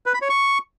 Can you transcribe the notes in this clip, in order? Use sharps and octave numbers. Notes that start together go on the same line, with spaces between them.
B4
B5
C#5
C#6